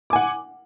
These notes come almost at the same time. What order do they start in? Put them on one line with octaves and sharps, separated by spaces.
D6 G#5 F#5